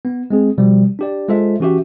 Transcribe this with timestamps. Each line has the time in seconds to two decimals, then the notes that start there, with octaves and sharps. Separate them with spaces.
0.05 B3
0.30 G#3 C4 G#4
0.58 B2 F3 G3
0.99 D4 G4 D5
1.29 G#3 F4 A4 C5 E5
1.60 E3 C#4 F#4 G4 E5